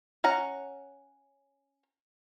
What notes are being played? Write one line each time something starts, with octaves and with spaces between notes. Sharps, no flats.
C#4 F#5 A#5